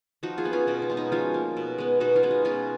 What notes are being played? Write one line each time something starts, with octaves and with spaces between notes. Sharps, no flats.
F3 D#4 F#4
F4 G#4
B3
C#4 F4
B2 D#4
D#4
G#3 B3
D#4
F3 C#4 F4
A#3
B2
G#3 B3
B2 D#4 F#4
C#4 F4
G#3 B3
D#4
B2 C#4 F4